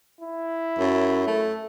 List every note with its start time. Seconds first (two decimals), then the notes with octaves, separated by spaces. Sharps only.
0.21 E4
0.79 F#2
1.27 A3